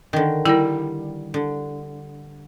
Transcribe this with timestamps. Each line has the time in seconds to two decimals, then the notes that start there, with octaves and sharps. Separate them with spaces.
0.13 D3 D#3
0.45 G3 E4 A#4
1.34 D3